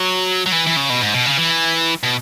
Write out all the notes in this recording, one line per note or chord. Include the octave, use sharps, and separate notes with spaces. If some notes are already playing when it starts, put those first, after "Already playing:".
Already playing: F#3
F#3
E3
E3
C#3
B2
G#2
B2
C#3
E3
B2